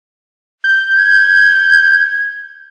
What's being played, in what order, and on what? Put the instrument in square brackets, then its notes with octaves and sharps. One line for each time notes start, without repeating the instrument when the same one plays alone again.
[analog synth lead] G6
[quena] G#6